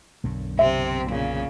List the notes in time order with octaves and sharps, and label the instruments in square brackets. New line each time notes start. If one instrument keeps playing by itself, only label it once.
[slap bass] B1 F#2 D3
[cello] C3 C4 [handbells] E5
[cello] A#2 C#3